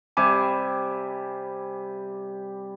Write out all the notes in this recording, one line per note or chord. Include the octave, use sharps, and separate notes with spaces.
C3 G3 G#5 D6